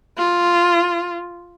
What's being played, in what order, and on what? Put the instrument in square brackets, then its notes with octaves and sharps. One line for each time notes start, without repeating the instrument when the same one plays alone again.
[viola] F4